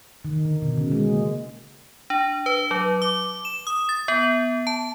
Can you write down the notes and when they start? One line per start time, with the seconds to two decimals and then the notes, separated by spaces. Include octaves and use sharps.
0.25 D#3
0.45 D3
0.62 B2
0.78 C#3
0.92 G#3
1.09 A#3
2.10 D4
2.46 B4
2.71 F#3
3.02 D6
3.45 E7
3.67 D#6
3.89 A6
4.08 B3
4.67 A5